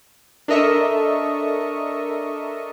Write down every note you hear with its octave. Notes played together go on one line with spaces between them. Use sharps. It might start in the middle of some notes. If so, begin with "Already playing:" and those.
D4 A4 A#4 D#5 E5 C#6